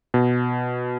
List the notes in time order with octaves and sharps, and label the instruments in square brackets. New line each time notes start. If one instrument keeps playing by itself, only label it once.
[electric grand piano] B2